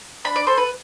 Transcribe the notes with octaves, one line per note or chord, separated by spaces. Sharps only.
D4 B5
D5
A4 C5
B4